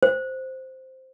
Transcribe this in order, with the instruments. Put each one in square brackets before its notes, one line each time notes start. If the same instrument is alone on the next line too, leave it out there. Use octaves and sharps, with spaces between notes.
[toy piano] C5